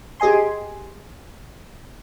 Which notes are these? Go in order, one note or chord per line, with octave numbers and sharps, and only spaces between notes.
G4 G#4 D#5 G#5 C6